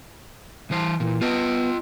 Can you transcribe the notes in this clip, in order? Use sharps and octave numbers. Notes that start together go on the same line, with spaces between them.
E3 C5
A#2 E3
B3 F4 D#5